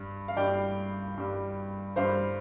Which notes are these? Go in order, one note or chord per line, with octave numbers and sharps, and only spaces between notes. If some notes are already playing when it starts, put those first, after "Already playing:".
Already playing: G2 G3
F5
G2 G3 D5 G5
G2 G3
G2 G3 C5 F5